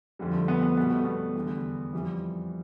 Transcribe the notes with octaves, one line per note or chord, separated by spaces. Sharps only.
F2 D3 G3
A3
B3
B3
B2 G3 B3
A3
B3
E2 D3 G3
F2 E3 G3